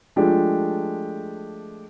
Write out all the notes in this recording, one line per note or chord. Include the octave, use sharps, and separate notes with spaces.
F3 G#3 A3 D4 G4